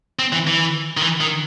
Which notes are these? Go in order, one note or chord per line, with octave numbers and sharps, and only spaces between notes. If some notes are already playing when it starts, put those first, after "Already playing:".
C4
E3
E3
D#3
E3
D#3